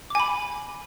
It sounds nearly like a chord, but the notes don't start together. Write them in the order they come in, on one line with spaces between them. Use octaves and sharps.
D6 G#5 B5